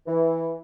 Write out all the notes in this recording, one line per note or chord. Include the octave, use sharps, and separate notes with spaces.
E3